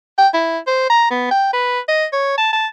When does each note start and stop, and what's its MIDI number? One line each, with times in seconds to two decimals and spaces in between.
0.18 0.28 79
0.34 0.58 64
0.67 0.89 72
0.90 1.07 82
1.11 1.28 59
1.31 1.48 79
1.53 1.80 71
1.88 2.05 75
2.13 2.33 73
2.38 2.53 81
2.53 2.67 81